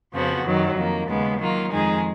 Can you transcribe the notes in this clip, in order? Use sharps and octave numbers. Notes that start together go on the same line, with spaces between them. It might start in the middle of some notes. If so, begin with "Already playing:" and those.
F2 C#3 F3 B3 F#4
F#2 D#3 F#3
F2 D#3 A#3
D#2 C#3 G#3 B3
D#3 F#3 A#3 F4
F2 D#3 G#3 D#4 G#4